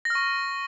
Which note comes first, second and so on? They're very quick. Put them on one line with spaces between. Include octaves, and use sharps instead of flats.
A#6 F6 C#6